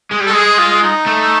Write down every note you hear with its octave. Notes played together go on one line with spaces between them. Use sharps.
G#3
G3
G#3 A4
G#4
F4
D#4
A3